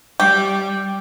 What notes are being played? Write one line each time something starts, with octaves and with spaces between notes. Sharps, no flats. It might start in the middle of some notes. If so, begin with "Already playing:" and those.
G3 G4